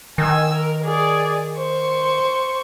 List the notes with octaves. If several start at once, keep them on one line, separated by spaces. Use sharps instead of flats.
D#3 G#5 E6
A#4
G#4 D5
C5 C#6